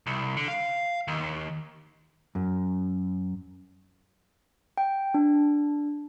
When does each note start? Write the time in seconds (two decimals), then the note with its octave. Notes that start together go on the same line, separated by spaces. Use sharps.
0.07 C2
0.37 D3
0.48 F5
1.08 D#2
2.35 F#2
4.78 G5
5.14 D4